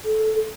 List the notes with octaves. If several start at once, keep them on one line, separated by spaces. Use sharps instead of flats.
A4